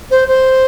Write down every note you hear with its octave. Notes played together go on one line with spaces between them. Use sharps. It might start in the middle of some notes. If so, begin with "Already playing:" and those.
C5
C5